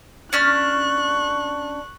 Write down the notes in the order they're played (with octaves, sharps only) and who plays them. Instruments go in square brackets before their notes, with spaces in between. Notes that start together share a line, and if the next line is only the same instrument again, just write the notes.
[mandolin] C#4 D4 F6 [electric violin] C#6 F#6